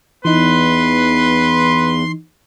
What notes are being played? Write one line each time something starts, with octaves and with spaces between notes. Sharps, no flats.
E2 E3 D#4 B4 C6